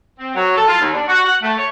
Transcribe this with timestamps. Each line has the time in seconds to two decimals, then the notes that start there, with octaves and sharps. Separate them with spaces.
0.18 C4
0.34 F#3
0.56 A4
0.68 F4
0.80 D#2
0.93 D4
1.07 F#4
1.25 F#5
1.41 A3
1.57 C#5